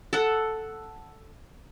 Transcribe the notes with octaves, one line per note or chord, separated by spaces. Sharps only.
A4 F#5